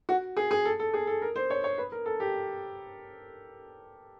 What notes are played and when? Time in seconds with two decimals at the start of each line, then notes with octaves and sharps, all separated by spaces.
0.09 F#4
0.37 G#4
0.51 G#4
0.65 A4
0.79 A4
0.94 G#4
1.07 A4
1.22 A#4
1.36 C5
1.50 C#5
1.64 C#5
1.78 B4
1.92 A#4
2.06 A4
2.20 G4